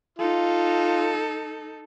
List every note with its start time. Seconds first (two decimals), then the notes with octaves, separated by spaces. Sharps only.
0.19 D#4 F4 A4